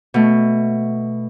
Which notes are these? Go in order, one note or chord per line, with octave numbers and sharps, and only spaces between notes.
B2 A3